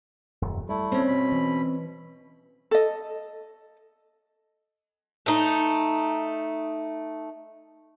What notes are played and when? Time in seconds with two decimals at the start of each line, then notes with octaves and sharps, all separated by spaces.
0.42 D#1 F#2
0.69 G3 A3 E4
0.92 C4 C#4
1.08 B2 B5
1.32 E3
2.71 A4 D#5
5.26 A3 D#4